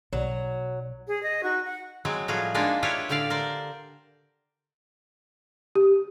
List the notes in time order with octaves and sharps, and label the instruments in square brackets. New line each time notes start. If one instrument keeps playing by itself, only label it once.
[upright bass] B1 [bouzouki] F#3
[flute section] G#4
D#5
D#4 F#4 C#6
F#5
[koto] F#3 G#3 C4
A2 F3 G3 F#4 G#4
G#3 A#3 D4 D#4 F4
E4 F4 G4 B4 C#5 F5
A2 D3 G4 D5 F5
A#4 C5 D5
[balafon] G4